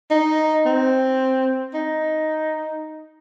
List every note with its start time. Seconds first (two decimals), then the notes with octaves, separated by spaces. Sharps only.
0.11 D#4
0.66 C4
1.74 D#4